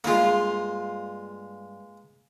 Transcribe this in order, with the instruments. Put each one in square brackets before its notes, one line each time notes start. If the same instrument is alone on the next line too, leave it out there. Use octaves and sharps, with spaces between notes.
[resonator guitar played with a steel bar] G2 F4 [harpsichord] G#3 A#3